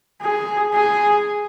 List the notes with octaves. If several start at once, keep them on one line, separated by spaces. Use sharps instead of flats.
G#4
G#4